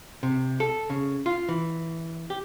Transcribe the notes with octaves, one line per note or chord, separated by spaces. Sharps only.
C3
A4
C#3
F4
E3
G4